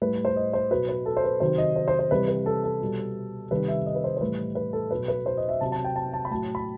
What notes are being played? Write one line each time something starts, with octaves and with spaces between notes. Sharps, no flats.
A2 G3 B4
C5
D#5
C5
B2 F#3 B4
B4
A4
C5
B4
C3 D#3 F#3 C5
D#5
C5
C5
C5
C3 E3 G3 B4
B4
A4
A4
B2 G3
C3 D#3 G3 B4
E5
D#5
B4
C5
C5
A2 E3 G3 B4
B4
A4
B2 F#3 B4
B4
C5
D#5
E5
C3 F#3 A5
A5
G5
A5
A5
B5
A2 F#3 A5
B5